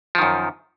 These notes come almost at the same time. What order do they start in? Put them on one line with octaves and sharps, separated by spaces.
F3 D#3 F#2